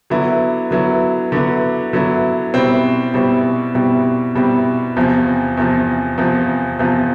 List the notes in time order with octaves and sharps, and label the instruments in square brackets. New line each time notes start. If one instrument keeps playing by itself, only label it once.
[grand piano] D3 F#3 B3 E4
D3 F#3 B3 E4
D3 F#3 B3 E4
D3 F#3 B3 E4
B2 G3 C4 E4
B2 G3 C4 E4
B2 G3 C4 E4
B2 G3 C4 E4
E2 C3 F3
E2 C3 F3
E2 C3 F3
E2 C3 F3